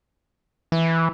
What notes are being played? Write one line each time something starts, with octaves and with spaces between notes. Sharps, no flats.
E3